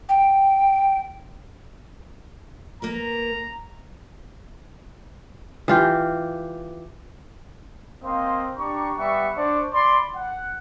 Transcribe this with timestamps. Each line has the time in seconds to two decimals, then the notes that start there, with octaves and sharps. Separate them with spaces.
0.09 G5
2.82 A#3 A#4 B4 A#5
5.68 E3 F4 G4
8.04 A#3 C4 C5 D#5 F5
8.57 D4 G4 A#5 C#6
8.98 G3 B3 E5 F#5 C#6
9.37 D4 C5 D5 C#6
9.74 D5 B5 C6
10.15 F#5